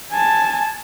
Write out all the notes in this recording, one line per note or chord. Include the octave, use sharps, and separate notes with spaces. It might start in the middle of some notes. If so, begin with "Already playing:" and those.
G#5 A5